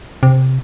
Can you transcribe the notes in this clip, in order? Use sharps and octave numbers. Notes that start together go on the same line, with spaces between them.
C3